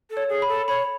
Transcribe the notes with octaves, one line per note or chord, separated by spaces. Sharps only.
A4
C#5
G#4
B5
A4
C#5 B5